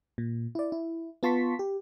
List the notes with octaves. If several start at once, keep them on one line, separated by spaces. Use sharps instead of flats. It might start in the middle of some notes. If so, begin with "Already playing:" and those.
A#2
E4 D5
E4
B3 F4 A5 C6 C#6 B6
G4